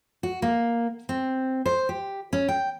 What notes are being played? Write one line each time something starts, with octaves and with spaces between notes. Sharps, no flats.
F#4
A#3
C4
C5
G4
C#4
G5